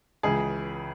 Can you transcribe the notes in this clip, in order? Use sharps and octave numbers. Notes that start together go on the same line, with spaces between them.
C#2 C#3 E3 G#4